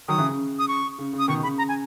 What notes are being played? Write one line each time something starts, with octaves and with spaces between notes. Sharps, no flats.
D#3 F#3 D#6
C#3 E3
C#3
D#6
C#6
C#3
C#3
D#6
B2 D#3 C#6
C#3 B5
A#5
G#5